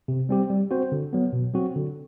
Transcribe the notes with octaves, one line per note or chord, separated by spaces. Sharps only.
C3
G3 C4 G4
G3
C4 F#4 C5
D3
F#3 B3
B2
F#3 C4 F#4
D3